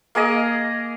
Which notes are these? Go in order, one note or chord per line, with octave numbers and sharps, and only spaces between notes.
A#3 G#4 D#5